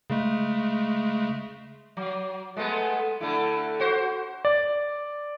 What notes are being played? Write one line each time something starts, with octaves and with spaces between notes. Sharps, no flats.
C#3 G#3 A3
F#3
G#3 A3 B3
D3 A3 E4
F#4 C5
D5